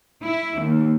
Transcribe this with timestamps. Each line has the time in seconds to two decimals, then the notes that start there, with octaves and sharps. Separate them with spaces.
0.23 E4
0.60 D#2